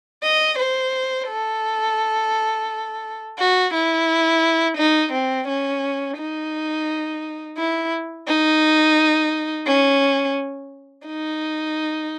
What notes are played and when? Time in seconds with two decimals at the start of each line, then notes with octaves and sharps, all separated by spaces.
0.24 D#5
0.59 C5
1.28 A4
3.39 F#4
3.74 E4
4.78 D#4
5.13 C4
5.48 C#4
6.17 D#4
7.58 E4
8.28 D#4
9.67 C#4
11.07 D#4